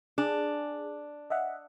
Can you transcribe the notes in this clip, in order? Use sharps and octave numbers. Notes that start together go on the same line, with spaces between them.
D4 G#4
D#5 E5 F#5